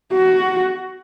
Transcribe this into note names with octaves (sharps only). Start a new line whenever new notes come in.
F#4